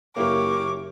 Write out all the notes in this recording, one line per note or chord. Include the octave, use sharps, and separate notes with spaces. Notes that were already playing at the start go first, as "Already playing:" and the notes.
F#1 A#3 E4 G4 A#4 C#5 D6